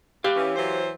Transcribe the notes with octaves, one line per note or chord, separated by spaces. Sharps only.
G4 F5
E3 C#4
E3 F#3 C5